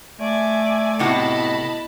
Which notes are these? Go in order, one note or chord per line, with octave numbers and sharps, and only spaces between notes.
A3 D5 G#5
A2 C3 B3 E4 F#4 D#5 A5 B5